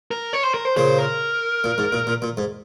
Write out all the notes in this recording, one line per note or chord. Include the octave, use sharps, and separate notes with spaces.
A#4
C#5
C5
A#4
C5
A#2 C#3 C5
A#4
A#2
G#2
A#2
A#2
A#2
G#2